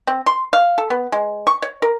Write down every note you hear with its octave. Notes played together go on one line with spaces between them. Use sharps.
C4
C6
F5
A4
B3
G#3
C#6
C#5
A#4